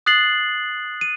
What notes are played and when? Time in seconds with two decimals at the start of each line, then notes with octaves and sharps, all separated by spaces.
0.06 D#6 F#6 A6 C7 F#7
1.01 D#7